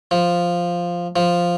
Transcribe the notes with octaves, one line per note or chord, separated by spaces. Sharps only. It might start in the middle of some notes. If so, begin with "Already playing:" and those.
F3
F3